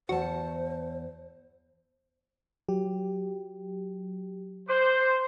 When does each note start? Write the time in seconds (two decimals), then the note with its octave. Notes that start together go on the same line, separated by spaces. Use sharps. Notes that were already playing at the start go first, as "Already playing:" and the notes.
0.09 E2 F#4 C5 A5
2.69 F#3 G4
4.68 C5 D6 F#6